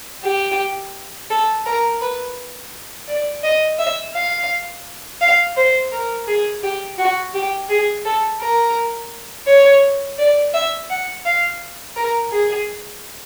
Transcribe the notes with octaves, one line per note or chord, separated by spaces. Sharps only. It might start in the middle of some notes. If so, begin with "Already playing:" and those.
G4
A4
A#4
B4
D5
D#5
E5
F5
F5
C5
A#4
G#4
G4
F#4
G4
G#4
A4
A#4
C#5
D5
E5
F#5
F5
A#4
G#4